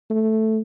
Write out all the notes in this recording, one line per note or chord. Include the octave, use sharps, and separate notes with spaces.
A3